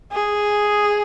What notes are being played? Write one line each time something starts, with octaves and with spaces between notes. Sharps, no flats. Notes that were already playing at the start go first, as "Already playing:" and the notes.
G#4